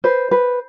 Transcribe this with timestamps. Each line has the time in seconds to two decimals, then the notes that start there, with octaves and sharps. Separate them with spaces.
0.04 B4 C5
0.31 B4